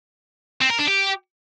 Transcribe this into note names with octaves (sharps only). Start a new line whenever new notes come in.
C4
A#4
D4
G4